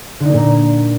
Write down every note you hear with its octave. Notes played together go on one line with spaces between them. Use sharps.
A#2 D3 A#3 D#4